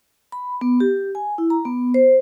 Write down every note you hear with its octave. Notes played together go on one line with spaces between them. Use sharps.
B5
B3
G4
G#5
E4
A#5
B3
C5